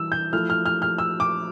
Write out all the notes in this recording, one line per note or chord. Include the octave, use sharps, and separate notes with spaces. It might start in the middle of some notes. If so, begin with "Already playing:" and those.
Already playing: E3 G3 E6
G6
F3 A3 E4 F6
F6
F6
F6
E6
D6